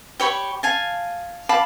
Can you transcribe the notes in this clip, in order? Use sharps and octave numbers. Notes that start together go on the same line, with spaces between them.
G4 C#5 B5 C#6
F5 G#5 A5
F5 A5 B5 D6